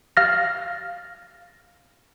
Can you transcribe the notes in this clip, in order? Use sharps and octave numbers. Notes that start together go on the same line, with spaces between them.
F5 F6 A6 A#6